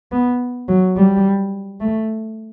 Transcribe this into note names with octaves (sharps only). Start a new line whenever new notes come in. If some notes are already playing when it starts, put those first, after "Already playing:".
B3
F#3
G3
A3